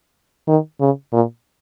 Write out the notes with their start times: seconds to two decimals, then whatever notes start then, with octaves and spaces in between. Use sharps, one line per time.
0.48 D#3
0.80 C#3
1.13 A#2